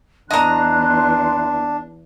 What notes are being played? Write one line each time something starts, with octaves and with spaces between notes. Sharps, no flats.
E2 D4 D#5 A#5 C6 F#6